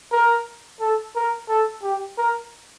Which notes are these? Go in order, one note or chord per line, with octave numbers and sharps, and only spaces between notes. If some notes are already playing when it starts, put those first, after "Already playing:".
A#4
A4
A#4
A4
G4
A#4